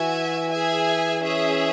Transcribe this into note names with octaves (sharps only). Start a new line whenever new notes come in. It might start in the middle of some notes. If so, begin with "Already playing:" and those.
Already playing: E3 F#4 E5 G#5
G#4 E5 G#5
C#4 G#4 E5